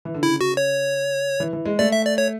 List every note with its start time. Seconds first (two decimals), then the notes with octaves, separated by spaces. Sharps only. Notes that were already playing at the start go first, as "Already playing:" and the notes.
0.05 E3
0.14 D3
0.23 C#3 E4
0.41 F#4
0.57 C#5
1.40 E3
1.53 E3
1.65 G#3
1.79 A3 D5
1.92 E5
2.05 D5
2.18 C#5